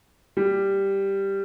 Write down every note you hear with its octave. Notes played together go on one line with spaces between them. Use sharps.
G3